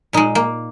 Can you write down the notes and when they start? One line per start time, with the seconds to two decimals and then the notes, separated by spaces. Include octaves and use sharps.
0.13 A#2 G#3 D#4
0.35 A#3